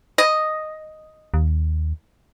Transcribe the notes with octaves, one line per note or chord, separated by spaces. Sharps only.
D#5
D#2